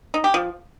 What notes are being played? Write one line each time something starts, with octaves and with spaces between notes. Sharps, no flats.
D#4
G4
F3